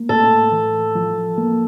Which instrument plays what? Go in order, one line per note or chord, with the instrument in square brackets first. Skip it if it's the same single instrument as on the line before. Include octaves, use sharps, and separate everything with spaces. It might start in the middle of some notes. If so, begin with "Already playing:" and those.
Already playing: [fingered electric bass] A#3
[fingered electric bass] A2 [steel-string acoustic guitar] A4
[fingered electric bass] E3
F3
A#3